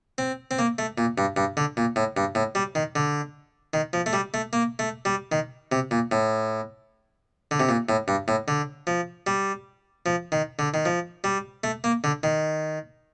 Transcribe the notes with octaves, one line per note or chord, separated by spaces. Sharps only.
C4
C4
A#3
A3
A#2
G2
G2
D3
A#2
A2
G2
A2
G3
D#3
D3
D#3
F3
A3
G3
A3
A#3
A3
G3
D#3
C3
A#2
A2
D3
C3
A#2
A2
G2
A2
D3
F3
G3
F3
D#3
D3
D#3
F3
G3
A3
A#3
D3
D#3